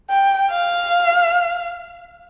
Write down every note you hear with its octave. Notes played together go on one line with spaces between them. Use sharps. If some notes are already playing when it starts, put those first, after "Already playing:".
G5
F5